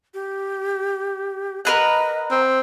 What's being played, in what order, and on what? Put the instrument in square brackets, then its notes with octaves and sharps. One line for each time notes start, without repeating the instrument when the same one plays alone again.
[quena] G4
[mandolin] A#4 B4 F#5 [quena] D#5
[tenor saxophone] C4